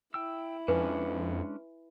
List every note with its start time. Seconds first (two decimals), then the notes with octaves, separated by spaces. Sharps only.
0.14 E4 G5 E6
0.68 F2 G#3 C#4 D4 B4 G#5